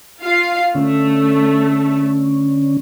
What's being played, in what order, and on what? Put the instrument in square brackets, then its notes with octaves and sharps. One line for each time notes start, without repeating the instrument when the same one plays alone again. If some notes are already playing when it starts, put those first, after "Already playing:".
[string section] F4 F5 C7
[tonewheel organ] D3 C#4 [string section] A3